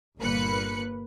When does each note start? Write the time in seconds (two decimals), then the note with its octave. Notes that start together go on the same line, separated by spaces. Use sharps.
0.19 G1 A#2 A#3 B4 F#6 C#7